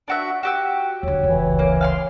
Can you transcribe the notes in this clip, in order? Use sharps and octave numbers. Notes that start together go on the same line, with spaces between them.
D4 F#4 E5
F#4 G4 E6
D#2 D3 C#5
F1 C#2 E3
A#3
F5 G#5 C6